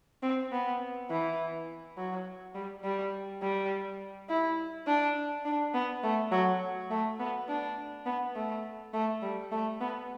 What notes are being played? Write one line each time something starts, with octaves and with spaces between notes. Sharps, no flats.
C4
B3
E3
F#3
G3
G3
G3
E4
D4
D4
B3
A3
F#3
A3
B3
D4
B3
A3
A3
G3
A3
B3